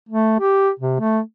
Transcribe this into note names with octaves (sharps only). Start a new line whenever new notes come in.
A3
G4
C3
A3